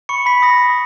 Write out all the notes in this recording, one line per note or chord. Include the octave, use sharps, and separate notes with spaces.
B5 C#6 C#7
B5 B6
D#6 A#6
B5